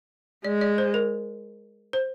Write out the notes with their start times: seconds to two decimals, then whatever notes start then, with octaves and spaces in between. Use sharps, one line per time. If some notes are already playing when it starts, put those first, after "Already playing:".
0.45 G#3 D5
0.61 D5
0.78 C5
0.94 A#4
1.93 C5